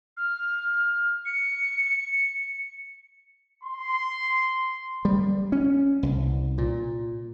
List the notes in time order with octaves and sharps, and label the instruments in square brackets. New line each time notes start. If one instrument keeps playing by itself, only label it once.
[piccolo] F6
C#7
[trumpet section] C6
[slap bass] G3
C#4
C2
A#2